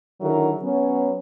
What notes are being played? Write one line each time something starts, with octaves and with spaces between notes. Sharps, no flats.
D3 D#3 F#3 E4 G#4 A#4
F#3 B3 C#4